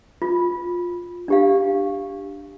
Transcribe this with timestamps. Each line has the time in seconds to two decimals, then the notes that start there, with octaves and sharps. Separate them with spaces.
0.22 F4
1.28 D4 G4 F5